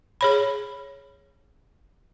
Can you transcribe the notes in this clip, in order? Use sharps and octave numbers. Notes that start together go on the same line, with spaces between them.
G#4 C#5 B5